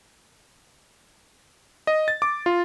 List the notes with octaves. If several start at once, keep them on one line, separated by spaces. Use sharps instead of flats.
D#5
A6
D6
F4